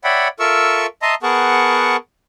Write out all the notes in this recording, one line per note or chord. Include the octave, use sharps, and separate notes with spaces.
C#5 D5 E5 F#5 G5 B5
F4 A4 A#4 E5 C#6 E6
D#5 E5 A5 A#5 C6 D#6
B3 G#4 A#4 F#5 A5 C#6